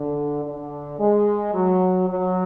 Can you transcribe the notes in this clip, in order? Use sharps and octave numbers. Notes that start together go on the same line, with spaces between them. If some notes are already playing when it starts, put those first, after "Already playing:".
Already playing: D3
D3
G#3
F#3
F#3